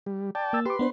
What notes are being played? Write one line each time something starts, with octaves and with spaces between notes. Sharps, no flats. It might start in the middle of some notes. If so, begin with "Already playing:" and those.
G3
D5 G5 A5
A#3 E6 A6
G4 B4 C6 D6
B3 D4 C5